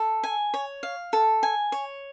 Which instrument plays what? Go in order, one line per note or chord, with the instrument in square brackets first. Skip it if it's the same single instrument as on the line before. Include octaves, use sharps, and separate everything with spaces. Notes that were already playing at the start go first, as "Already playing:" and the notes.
Already playing: [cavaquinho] A4
G#5
C#5
F5
A4
G#5
C#5